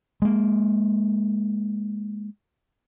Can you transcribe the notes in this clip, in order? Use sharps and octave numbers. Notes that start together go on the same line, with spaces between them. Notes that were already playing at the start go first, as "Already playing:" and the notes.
G#3 A#3